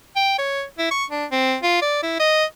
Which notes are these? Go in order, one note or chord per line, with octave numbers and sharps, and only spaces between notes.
G5
C#5
E4
C#6
D4
C4
F4
D5
E4
D#5